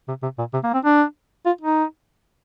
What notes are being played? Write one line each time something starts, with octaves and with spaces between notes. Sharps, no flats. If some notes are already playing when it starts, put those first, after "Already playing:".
C3
C3
A#2
C3
A#3
C4
D4
F4
D#4